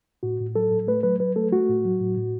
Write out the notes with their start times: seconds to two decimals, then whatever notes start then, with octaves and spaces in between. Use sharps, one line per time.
0.23 A2 F#4
0.40 A2
0.55 F#3 A4
0.71 A2
0.87 A3 B4
1.03 F#3 B4
1.20 F#3 B4
1.36 A3 A4
1.52 A3 F#4
1.69 A2
1.85 F#3
2.00 A2
2.17 A2